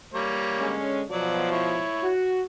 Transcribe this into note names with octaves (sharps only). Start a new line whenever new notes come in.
G3 A#3 C#5
D3 G#3 C#4
B2 F3 F#3 D5
E4 C#5
F#4